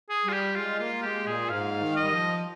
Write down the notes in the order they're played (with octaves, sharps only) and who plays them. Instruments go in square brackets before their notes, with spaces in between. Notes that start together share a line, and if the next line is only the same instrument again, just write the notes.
[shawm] G#4
[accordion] G3 [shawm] F4
[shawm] G4
[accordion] G#3 [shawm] F4
[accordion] A#3 [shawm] F4
[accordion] G#3 [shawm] G4
[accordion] A#2 [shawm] G#4
[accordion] G#2 [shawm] F5
[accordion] D#3
[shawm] D#5
[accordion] G3
F3